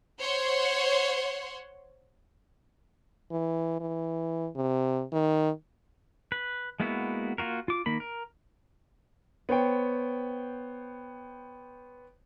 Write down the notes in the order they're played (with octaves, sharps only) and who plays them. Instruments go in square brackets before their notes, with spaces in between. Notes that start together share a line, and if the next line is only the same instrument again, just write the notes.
[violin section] C5 C#5 F#5 C6
[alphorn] E3
E3
C3
D#3
[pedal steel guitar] B4
G#3 A#3 B3 E4 F#4
A#3 F4 F#4 A#4
F4 D6
D#3 A#3 B5
A#4
[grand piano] B3 C5 C#5 G5